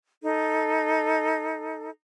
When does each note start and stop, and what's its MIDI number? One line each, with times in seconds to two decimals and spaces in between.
0.24 1.90 63
0.24 1.90 69